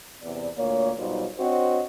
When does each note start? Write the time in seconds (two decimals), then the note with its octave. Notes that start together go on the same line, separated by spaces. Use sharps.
0.22 E2 C3 B3 D5
0.57 D2 A#2 A#3 C#5
0.98 B2 F#3 G3 D#4 F4 C5
1.39 C4 D4 F#4 C5 C#5 D#5